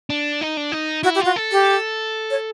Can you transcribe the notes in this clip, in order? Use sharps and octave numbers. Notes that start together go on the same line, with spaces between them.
D4
D#4
D4
D#4
E4 F#4
G4
F4 F#4
A4
G4
C#5